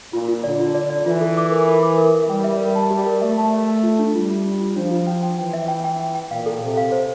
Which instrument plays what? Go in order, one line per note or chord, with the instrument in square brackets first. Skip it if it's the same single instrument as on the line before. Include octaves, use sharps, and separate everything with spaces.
[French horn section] A#2 [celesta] F4
[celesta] F4
[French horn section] D3 [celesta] D5
[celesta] F4
D5
D5
[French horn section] E3 [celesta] F4
[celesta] A4
D6
A#4
A#4
D6
A#4
E5
[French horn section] G3 [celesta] G5
[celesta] E5
A#4
A5
[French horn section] G3 [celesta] G4
[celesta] A#4
[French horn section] A3 [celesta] E5
[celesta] A5
E5
A5
F4
D4
[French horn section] G3 [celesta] F4
[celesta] F4
D4
F4
[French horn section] F3 [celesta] D4
[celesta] F4
G5
G5
[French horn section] E3 [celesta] G5
[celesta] E5
G5
G5
G5
G5
[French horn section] A#2 [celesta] F5
[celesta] A4
[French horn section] C3 [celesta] A4
[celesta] F5
C5